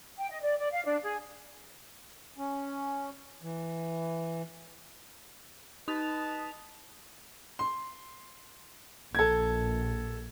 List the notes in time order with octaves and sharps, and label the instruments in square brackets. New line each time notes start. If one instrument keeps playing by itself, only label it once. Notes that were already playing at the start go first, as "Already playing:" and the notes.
[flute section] G5
D#5
D5
D5
F5
D4
G#4
[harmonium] C#4
E3
[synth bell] D#4 D#6 F7 [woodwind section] B4 D#5 A5
[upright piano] C6
[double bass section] A#1 [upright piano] A4 G#6